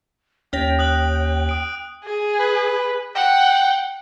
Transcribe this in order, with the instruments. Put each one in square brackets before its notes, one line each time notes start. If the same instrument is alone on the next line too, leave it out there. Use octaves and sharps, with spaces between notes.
[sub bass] D#2 [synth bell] C#4 C#5 A#6 [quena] G5
[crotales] D#6 F#6 F#7
D#6 D7
[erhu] G#4
[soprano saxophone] B4
[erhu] F#5 [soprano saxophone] G5